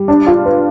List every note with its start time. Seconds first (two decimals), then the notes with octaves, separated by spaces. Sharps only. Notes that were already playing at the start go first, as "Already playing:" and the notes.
Already playing: G3
0.08 D4
0.27 F4
0.45 B4